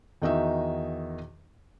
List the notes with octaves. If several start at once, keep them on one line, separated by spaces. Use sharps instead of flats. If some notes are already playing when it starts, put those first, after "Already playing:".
E2 D#3 D#4 F#4 D#5 E5